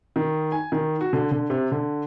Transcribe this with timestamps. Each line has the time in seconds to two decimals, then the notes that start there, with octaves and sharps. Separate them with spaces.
0.16 D#3
0.52 G#5
0.72 D#3
1.01 F#4
1.13 D3
1.31 D3
1.50 C3
1.72 D3